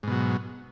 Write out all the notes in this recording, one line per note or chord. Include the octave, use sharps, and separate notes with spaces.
G#2 B2 F#3